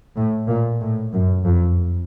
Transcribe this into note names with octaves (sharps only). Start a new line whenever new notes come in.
A2
A#2
A2
F#2
F2